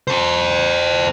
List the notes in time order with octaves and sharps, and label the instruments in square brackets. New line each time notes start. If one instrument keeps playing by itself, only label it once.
[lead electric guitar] A4 C5